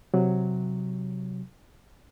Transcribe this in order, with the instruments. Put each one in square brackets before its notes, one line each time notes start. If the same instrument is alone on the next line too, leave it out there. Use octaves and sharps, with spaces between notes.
[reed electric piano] C3 F#3